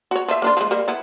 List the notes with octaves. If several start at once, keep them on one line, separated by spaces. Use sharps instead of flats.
F#4 C#5
F3 E5
A#3 D4 F4
F3 G#3
G3 A#3
B3 E4